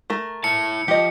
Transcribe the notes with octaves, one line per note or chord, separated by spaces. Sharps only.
A3 A#4
E4 A5 C#7
F3 G4 D#5